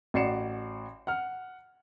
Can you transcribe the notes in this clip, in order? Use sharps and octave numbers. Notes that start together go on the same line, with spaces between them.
A1 F#4 D5 C7 C#7 E7
F#5 F6